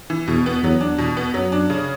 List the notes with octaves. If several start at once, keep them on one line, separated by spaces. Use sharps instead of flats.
E3
E2 B2
B3
E2 F#3
D4
E2 B2
B3
F#2 F#3
D4
C#3